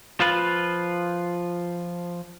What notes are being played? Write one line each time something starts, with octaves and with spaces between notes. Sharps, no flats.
F3 F4 B4